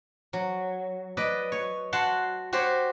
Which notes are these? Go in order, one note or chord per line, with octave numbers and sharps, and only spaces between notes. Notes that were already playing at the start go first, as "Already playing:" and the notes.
F#3
B4 D5 D#5
C#5
F#4 F#5 A5 C6
F#4 G4 C5 C#5